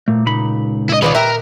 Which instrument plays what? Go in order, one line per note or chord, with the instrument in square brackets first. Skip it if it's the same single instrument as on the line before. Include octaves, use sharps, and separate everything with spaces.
[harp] A#2 [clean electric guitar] A3
[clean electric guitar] C#2 D#4 B5
[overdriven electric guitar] E4 D#5
[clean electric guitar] D#3 G#4 [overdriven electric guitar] C#4 F4 [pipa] B4 C#5 D5
[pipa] G4 E5 [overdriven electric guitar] A#4 [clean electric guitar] B4